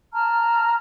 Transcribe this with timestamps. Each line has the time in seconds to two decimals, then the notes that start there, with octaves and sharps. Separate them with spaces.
0.14 A5 A#5 F6